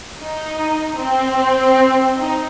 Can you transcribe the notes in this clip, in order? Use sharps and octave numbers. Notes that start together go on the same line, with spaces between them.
D#4
C4
D#4